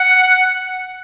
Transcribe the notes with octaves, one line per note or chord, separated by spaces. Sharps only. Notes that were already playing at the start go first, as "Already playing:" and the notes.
Already playing: F#5